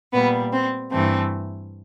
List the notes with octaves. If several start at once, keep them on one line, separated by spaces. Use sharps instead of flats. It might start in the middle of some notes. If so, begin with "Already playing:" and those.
A#2 G3 B3
C4
G2 E3 A3 C4